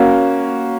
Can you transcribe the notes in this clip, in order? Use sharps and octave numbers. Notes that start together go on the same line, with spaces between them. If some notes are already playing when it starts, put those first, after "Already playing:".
Already playing: A#3 C#4 F#4